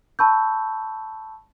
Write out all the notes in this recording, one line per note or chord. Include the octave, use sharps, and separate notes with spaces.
A5 B5 C#6 E6 G6